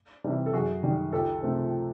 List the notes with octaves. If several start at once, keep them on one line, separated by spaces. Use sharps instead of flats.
C3 E3 G3
A4
F#2 F#4 G#4
D#3 G3
C#2 G4 A4
C3 F3 A3